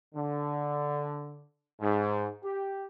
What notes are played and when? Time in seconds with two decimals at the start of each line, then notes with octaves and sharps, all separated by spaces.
0.15 D3
1.81 G#2
2.44 G4